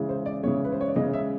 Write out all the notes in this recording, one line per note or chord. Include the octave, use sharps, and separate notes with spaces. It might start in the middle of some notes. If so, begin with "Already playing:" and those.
Already playing: C#3 E3 G#3
C5
D5
C#3 E3 G#3 C#5
B4
C5
C#5
D5
C#3 E3 G#3 D#5
E5